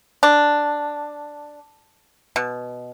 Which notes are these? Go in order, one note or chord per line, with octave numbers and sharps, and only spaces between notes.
D4
B2